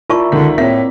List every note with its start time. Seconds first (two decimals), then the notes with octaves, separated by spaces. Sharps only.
0.10 E4 F4 A#4 D5 E5 A5 C#6
0.32 C#2 D3 D#3 B6
0.58 A2 A#3 C4 E5 B6